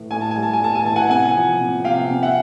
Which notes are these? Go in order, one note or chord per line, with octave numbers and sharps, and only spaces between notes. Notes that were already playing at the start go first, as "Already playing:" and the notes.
Already playing: A2 E3
A2 G#5
A5
G3 G#5
A5
G#5
A2 A5
G#5
E3 A5
F#5 G#5
C3 F#5 G#5
F3
C3
C3 F5 G5
C3
E5 F#5